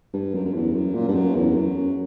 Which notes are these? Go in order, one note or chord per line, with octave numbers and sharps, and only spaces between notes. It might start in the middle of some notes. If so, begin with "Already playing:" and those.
G2
F#2
F#2
E2
F#2
A#2
G2
F#2
E2
F#2